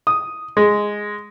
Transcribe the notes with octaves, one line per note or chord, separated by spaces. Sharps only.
D#6
G#3